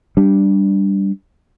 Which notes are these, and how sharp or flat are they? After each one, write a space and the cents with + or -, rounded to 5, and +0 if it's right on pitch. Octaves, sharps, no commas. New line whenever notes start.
G3 +0 D4 -5